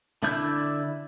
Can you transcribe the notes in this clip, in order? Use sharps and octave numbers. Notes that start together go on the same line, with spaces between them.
D3 D4 E4 E5 G6